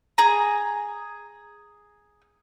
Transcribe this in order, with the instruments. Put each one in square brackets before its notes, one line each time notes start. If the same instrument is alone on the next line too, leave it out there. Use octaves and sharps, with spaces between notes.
[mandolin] G#4 A#5